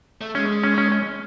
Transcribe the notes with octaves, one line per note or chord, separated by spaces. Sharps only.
A3
G#3 C#4
C#4
C#4
C#4